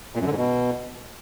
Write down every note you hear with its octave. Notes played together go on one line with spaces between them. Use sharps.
A#2
F#2
D3
G#2
B2